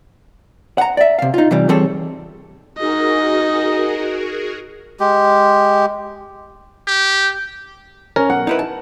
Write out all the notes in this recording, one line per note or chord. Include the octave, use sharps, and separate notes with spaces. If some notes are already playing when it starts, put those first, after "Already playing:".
F#5 A#5
D5 E5
C3 F5
D#4 F4
C3 E3 G3
E3 G3 C4 G#4 A4 C#5
D#4 F#4 G#4 A#4 D#5
G#3 G4
G4
C#4 A#4
B1 F#5
D#4 E4 B4
A5